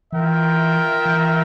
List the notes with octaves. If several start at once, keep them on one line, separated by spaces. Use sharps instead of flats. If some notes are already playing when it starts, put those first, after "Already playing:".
E3 F4 A#4 E5 G5
E3